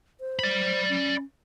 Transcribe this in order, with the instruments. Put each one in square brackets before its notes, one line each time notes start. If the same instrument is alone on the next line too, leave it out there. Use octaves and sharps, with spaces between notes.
[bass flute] C5
[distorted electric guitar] D5 B5
[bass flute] C#4